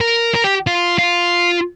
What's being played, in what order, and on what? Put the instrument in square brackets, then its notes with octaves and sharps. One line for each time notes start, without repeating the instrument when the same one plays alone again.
[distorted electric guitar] A#4
A#4
G4
F4
F4